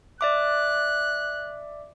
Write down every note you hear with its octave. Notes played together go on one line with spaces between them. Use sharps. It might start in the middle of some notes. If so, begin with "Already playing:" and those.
D5 E5 D6 F#6